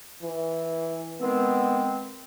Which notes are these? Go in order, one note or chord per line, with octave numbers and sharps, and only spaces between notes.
E3
D#3 G#3 B3 C4